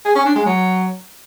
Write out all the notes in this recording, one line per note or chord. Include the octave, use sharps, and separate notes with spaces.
G#4
C#4
D4
G#3
F#3